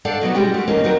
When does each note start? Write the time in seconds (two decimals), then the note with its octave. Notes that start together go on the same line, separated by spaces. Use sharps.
0.05 D4 A4 C5 D5 F5 F#5
0.21 B2 F#3 B3 D#4
0.34 G3 G#3 C#4 E4 F#4 G4
0.54 A3 D4
0.68 E2 A#3 C#4 D#4
0.84 D#3 F#3 C4 A#4